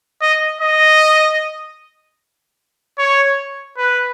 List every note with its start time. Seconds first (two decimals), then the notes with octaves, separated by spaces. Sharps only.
0.22 D#5
0.61 D#5
2.98 C#5
3.77 B4